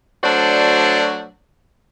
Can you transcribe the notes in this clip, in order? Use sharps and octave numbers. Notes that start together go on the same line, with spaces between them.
F#3 A3 D4 F#4 C5 D5